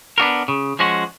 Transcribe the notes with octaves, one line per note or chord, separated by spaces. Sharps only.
B3 D4 F#4 A#4
C#3
F3 G#3 C#4 F#4